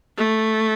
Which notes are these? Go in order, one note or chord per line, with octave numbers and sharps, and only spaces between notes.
A3